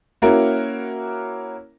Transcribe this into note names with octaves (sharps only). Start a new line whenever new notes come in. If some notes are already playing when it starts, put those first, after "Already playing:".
A#3 C#4 E4 F#4 A#4